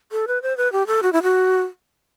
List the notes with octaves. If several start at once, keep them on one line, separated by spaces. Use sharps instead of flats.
A4
B4
C5
B4
G4
A4
F#4
E4
F#4